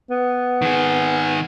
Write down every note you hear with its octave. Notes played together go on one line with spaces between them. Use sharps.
B3
D#3 G#4